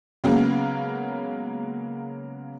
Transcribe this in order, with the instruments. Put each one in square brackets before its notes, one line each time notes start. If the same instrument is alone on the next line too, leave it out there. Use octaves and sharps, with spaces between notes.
[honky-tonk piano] C#3 F#3 G#3 A#3 B3 C#4